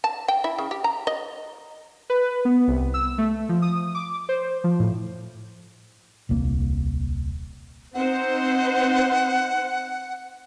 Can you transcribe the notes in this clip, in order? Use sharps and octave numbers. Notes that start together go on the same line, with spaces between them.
A5
G5
E4
C#3
G4
A#5
D#5
B4
B3
C2
E6
A3
F3
D#6
D6
C5
F3
A2
D#1 C2 A#3
C4 D#4 C5 F#5